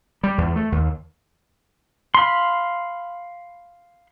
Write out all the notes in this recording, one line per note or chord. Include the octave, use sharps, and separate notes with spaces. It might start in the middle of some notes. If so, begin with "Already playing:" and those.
G3
E2
A3
D#2
F5 B5 C6